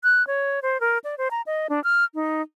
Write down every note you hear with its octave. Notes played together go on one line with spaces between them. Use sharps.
F#6
C#5
C5
A#4
D5
C5
A#5
D#5
D4
F6
D#4